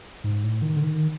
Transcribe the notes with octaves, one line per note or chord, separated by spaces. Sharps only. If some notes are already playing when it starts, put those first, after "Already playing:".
G#2
A2
D#3
D3
D#3